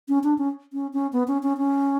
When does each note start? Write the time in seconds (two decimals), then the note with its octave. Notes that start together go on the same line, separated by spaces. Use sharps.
0.08 C#4
0.24 D4
0.38 C#4
0.73 C#4
0.93 C#4
1.13 B3
1.28 C#4
1.43 C#4
1.58 C#4